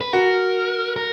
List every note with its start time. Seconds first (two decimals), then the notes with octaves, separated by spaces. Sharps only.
0.01 B4
0.13 F#4 A#4
0.96 A#4